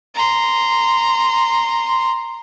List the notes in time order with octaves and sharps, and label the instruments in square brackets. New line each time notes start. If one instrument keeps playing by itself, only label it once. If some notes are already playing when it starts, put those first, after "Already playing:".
[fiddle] A#5 C6